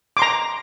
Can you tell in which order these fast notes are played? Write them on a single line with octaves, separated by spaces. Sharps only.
D6 C6 A#5